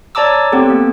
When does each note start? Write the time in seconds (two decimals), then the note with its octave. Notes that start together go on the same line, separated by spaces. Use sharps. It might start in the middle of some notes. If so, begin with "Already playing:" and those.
0.15 C#5 D5 A5 A#5 D6 E6
0.52 B3 C4 G4 A4
0.70 A#3